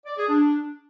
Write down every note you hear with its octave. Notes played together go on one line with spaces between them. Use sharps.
D5
G#4
D4